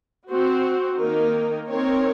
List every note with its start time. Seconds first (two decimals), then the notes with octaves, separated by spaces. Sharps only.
0.30 C4 F#4 C5
0.99 D#3 A#3 D#4 A#4
1.68 C4 D#4 A#4 C#5